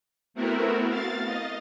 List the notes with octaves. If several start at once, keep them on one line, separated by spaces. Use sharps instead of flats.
A3 B3 C4 E4 F#4 A#4
F5 A6
D#5